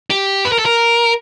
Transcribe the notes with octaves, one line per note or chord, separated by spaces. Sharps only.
G4
B4
A#4
A4
A#4